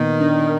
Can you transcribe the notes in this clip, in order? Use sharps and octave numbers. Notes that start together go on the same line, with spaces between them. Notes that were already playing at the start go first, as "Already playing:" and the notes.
Already playing: A#2 D#3 B3
D4